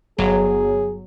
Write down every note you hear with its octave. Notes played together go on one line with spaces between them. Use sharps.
G1 F#3 G#4